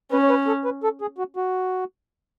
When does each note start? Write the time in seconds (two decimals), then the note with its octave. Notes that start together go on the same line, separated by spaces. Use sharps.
0.12 C#4 B4
0.23 C#5
0.29 B4
0.47 A4
0.65 B4
0.83 A4
1.01 G#4
1.18 F#4
1.36 F#4